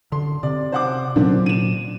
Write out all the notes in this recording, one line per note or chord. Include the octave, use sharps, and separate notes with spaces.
D3 C6
C3 D5
C5 F#5 D6
A#2 D3 F#3 C4 D4
D#7 E7